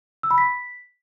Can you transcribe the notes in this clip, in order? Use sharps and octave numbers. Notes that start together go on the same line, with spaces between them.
E6
B5
B6